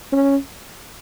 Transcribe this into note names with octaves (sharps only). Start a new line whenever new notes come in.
C#4